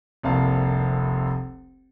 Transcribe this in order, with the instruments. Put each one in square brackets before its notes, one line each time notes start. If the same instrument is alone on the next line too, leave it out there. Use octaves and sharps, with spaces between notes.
[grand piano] F1 C2 A#3 F5 A5